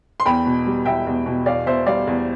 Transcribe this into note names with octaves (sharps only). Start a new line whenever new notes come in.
C6
E2 G5 B5
B2
G3
E2 E5 G5
E2
B2
E2 D5 F5
B2 C5 E5
G3 D5 F5
E2